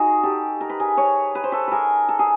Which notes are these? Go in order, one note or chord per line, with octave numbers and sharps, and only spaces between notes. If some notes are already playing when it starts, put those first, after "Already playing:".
Already playing: D#4 F#4 G#4
G4 A4
A#4
B4
G#4 A#4
B4 C#5
B4
C5
A4 B4
G#4 A#4 B4
A4
G#4